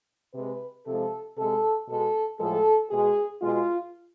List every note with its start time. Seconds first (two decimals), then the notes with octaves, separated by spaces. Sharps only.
0.33 C3 G#3 B4
0.85 C3 F3 G#3 A4
1.36 C3 G#3 A4
1.88 B2 G#3 A4
2.38 A2 F3 G#3 A4
2.90 B2 G#3 G#4
3.41 B2 G#3 F4